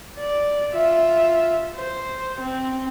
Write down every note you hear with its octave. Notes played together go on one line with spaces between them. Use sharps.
D5
F4 E5
C5
C4